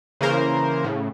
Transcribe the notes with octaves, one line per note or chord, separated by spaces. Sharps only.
C#3 E3 A#3 A#4 C5
A2 C#3